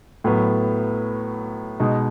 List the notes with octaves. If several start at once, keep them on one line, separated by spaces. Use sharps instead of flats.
A2 F#3 B3
B2 G#3 D#4